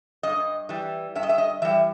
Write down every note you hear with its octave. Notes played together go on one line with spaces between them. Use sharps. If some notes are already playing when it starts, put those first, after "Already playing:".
G2 D#5
E3 G3
G2 E5
D#5
E5
D#5
E3 G3 E5